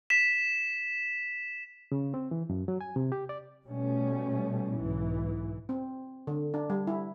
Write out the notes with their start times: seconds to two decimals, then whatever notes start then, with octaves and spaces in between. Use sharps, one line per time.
0.10 B6 E7
1.92 C#3
2.14 C4
2.31 E3
2.50 F#2
2.68 F#3
2.81 G#5
2.96 C3
3.12 G4
3.29 D5
3.65 B2 G3 A3 C#4
4.74 B1 G#2 E3
5.69 C4
6.27 D3
6.54 D4
6.70 G3
6.87 E4